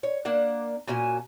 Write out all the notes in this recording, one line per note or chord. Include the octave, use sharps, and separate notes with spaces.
C#5
A#3 D4 F#5
A#2 C#4 F#4 G#5